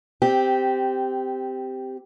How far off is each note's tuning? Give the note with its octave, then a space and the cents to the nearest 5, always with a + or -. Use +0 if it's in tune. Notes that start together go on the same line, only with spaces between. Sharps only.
C4 -15 G4 +0